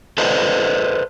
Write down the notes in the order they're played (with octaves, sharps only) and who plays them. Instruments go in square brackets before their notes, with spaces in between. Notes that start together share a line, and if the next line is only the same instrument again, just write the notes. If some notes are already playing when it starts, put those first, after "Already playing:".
[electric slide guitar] A4 B4 C5 D5 D#5